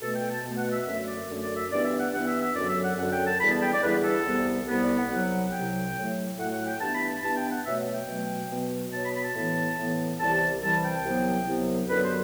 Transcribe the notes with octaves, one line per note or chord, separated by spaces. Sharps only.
B2 A3 A4
G5
A5
B2 A3
F#5
E5
F#2 D3 A3 E5
D5
F#2 D3 A3
D5
E5
G2 E3 B3 D5
E5
F#5
G2 E3 B3 F#5
E5
E5
F#2 D3 F#3 D5
E5
F#5
F#2 D3 F#3 F#5
G5
A5
E2 D3 G3 B3 B5
A5
G5
D5
E2 D3 G3 B3 B4
A4
C2 C3 G3 B3
C2 C3 G3 B3
D5
F#5
C2 C3 F#3 F#5
C2 C3 F#3 G5
A2 F#3 A3
A2 F#3 A3 F#5
F#5
G5
G2 E3 B3 A5
B5
A5
G2 E3 B3 A5
G5
F#5
B2 F#3 A3 E5
G5
B2 F#3 A3
B2 F#3 B3
B2 F#3 B3 A5
B5
B5
A5
A2 E3 B3
A2 E3 B3
C2 C3 E3 G3 A5
C2 C3 E3 G3 A5
G5
C2 C3 F#3 B3
C2 C3 F#3 B3
F#2 D3 F#3 B3 B4
C5